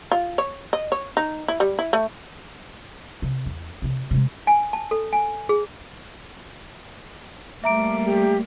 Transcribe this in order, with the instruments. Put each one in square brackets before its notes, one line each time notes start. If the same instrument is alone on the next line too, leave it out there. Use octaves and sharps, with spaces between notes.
[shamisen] F4
C#5
D#5
C#5
D#4
E4
G3
E4
A3
[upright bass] C3
E2
C3 D#3
C3 G#3
[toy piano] G#5
A5
A4
G#5
G#4
[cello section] G3 A3 A#3 [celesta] E5 A#5 D7 [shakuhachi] D6
[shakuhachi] G4